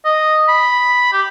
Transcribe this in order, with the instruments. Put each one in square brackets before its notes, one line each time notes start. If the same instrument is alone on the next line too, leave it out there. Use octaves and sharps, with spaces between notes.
[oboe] D#5
B5
G4